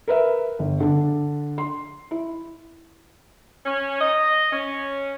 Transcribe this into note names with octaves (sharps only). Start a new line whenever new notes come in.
A#4 B4 E5
G1
D3 D4
C6
E4
C#4
D#5
C#4